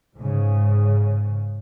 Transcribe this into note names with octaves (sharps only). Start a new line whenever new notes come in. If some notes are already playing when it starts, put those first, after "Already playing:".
G#2 C#3